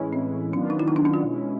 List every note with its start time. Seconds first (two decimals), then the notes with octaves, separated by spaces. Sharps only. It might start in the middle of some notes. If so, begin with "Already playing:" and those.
Already playing: A2 E3 G#3 C#4 E4
0.13 C4
0.53 D#3 F#3 B3 C#4 D4 F4
0.70 D#4
0.79 E4
0.88 D#4
0.96 D4
1.05 C#4
1.14 F4
1.22 B2 G#3 C#4 E4